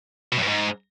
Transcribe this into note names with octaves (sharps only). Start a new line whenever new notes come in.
B2
F#2
G2
G#2